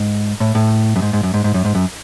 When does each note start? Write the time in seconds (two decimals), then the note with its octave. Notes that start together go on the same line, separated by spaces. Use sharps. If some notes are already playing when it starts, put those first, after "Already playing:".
Already playing: G#2
0.40 A2
0.55 A2
0.96 F#2
1.02 G#2
1.13 G#2
1.23 F#2
1.34 G#2
1.44 G#2
1.54 F#2
1.65 G#2
1.75 F#2